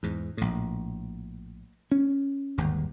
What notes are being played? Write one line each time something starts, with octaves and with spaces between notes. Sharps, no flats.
E2 G#2
A#1 A2
C#4
G1 D#2 G#2